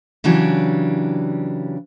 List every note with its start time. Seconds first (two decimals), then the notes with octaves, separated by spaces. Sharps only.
0.24 C#3 E3 F#3 D4 G4